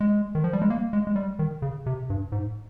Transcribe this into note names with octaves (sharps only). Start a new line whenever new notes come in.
G#3
D#3
F3
G3
G#3
A#3
G#3
G#3
G3
D#3
C#3
C3
G2
G#2